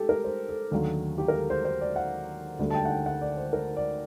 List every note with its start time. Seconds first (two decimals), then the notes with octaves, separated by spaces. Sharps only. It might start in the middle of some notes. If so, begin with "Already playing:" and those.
Already playing: G4 A4
0.09 A#4
0.24 C5
0.49 A4
0.71 D#2 D3 F#3 A3
1.18 G4
1.28 A#4
1.34 A4
1.50 C5
1.65 C5
1.81 D5
1.96 F#5
2.59 D2 D3 G3
2.70 A5
2.75 G5
2.85 F#5
2.90 G5
3.06 F#5
3.21 D5
3.37 C5
3.53 A#4
3.76 D5